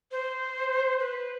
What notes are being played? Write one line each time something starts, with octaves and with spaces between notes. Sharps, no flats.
C5
B4